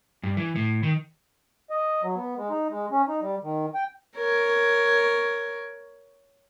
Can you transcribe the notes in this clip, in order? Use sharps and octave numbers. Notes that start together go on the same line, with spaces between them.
G2
E3
A2
D#3
D#5
F#3
B3
G#3
D#4
G#3
C#4
D#4
G3
D#3
G5
A#4 C#5